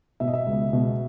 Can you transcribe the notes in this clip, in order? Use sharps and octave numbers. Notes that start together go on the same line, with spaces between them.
B2 E5
D#5
E5
C#2
B2